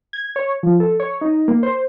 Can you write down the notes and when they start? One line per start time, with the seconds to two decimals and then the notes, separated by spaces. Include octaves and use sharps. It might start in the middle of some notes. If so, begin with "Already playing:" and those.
0.13 G#6
0.36 C#5
0.63 F3
0.80 A4
1.00 C#5
1.21 D#4
1.48 A#3
1.63 C5